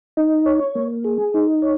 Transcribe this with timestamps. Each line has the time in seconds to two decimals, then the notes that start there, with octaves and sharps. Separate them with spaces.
0.17 D#4
0.46 C#5
0.75 A#3
1.04 G#4
1.34 D#4
1.62 C#5